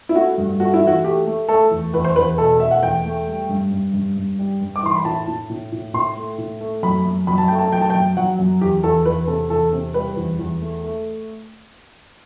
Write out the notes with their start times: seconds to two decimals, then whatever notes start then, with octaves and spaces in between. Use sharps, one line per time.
0.09 E4
0.15 A3 F#4
0.38 G2
0.59 A3 F#4
0.74 E4
0.82 E3 F#4
1.04 A3 G4
1.27 A3
1.48 A3 A4
1.71 E2
1.93 E2 B4
2.04 C5
2.16 E2 B4
2.38 B2 A4
2.60 A3 E5
2.71 F#5
2.83 E2 G5
3.05 A3
3.27 G3
3.49 G2
3.71 G2
3.94 G2
4.17 G2
4.39 G3
4.61 G2
4.76 D6
4.83 E3 C6
4.95 B5
5.05 A2 A5
5.28 A2
5.50 A2
5.72 A2
5.94 A2 C6
6.16 A3
6.38 A2
6.61 A3
6.83 F#2 B5
7.05 F#2
7.27 F#2 B5
7.38 A5
7.48 A3 G5
7.59 A5
7.72 F#3 G5
7.82 A5
7.90 G5
7.95 F#2
8.17 F#3 F#5
8.39 F#2
8.61 E2 G4
8.83 E2 A4
9.05 E2 B4
9.28 C3 A4
9.50 E2 A4
9.73 C3
9.94 G3 B4
10.17 E2
10.39 E2
10.61 A3
10.84 A3